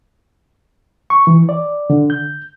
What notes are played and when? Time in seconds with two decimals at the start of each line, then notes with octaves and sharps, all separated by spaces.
1.10 C#6
1.27 E3
1.49 D5
1.90 D3
2.10 G6